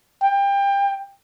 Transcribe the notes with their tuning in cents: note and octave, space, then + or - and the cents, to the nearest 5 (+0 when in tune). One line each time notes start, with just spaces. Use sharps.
G5 +25